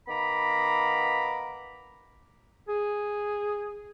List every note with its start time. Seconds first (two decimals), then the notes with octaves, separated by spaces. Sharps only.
0.08 D#3 B3 F5 A#5 B5 D6
2.68 G#4